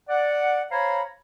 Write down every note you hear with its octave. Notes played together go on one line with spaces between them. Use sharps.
D5 F#5
C5 C#5 F5 G#5 A#5 B5